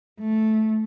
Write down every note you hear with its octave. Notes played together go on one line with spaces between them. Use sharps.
A3